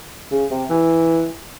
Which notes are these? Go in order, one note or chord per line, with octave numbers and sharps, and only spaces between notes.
C#3
C3
E3